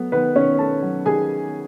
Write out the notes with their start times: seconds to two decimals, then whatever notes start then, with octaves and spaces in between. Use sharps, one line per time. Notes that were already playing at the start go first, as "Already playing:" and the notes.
Already playing: F#3 A3 B3
0.12 D#3 B3 B4
0.36 D#3 C#4 C#5
0.59 A3 A4 A5
0.82 F#3
1.06 D#3 G#4 G#5